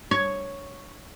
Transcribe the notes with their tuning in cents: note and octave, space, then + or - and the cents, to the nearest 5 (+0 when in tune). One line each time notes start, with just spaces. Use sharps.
C#5 +0